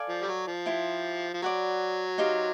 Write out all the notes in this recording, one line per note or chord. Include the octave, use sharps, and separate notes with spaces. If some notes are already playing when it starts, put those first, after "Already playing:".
Already playing: A4 D5 F5 G#5
F3
G3
F#3
F3
E4 G4 C5
F3
F#3 D5 F#5 B5
D#4 G4 C5 F5